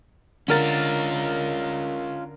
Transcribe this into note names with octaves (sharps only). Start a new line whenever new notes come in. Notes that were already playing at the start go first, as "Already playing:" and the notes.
D3 C#4 F4 A#4 A6